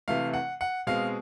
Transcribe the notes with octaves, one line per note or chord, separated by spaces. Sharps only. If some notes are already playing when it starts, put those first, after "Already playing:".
C3 E3 A3 F5
F#5
F#5
B2 G#3 C4 F5